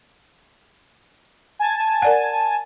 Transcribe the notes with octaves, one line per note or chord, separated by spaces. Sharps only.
G#5 A5
A#4 D5 F#5